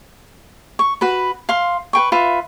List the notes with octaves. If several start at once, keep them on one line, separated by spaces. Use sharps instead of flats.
C#6
F#4 B4 B5
F5 C6
B4 G5 C#6
F4 B4 E5